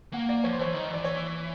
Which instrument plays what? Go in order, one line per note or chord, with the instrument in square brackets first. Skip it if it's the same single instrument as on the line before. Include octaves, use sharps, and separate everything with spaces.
[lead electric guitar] A#3 [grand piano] F#5
[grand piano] D5
[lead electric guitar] F3 [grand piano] C#5
[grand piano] C5
[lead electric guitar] E3 [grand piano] C#5
[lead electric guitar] D#3
[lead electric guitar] E3 [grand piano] D5
[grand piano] C#5